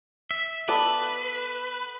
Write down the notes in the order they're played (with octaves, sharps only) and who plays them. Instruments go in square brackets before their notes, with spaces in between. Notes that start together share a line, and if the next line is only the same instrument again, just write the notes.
[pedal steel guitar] E5
[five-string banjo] B3 A4 D5 [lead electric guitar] B4 [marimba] A5 B5